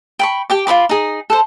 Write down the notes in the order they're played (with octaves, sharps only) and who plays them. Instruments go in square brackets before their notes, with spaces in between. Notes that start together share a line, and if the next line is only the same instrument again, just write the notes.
[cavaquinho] G5 B5 C#6
G4 G5 D6
F4 C#5 B5 D6
D#4 G#4
A4 B4 C5